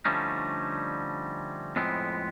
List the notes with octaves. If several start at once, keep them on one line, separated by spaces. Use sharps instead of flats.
D3 F3 G3 A3 C#4 D#4
F2 A2 G#3 B3 C4